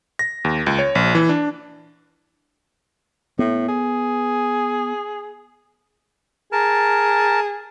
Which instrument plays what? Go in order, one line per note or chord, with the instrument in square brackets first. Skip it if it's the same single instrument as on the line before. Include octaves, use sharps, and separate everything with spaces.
[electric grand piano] A#6
D#2
C#2
C#5
A#1
E3
D4
[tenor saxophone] A2 [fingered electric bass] B3
[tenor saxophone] G#4
[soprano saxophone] G#4 [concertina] A#4 A5